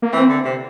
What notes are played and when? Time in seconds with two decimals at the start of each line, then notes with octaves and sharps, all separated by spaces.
0.02 A#3
0.13 E3 C4
0.29 D3
0.44 C3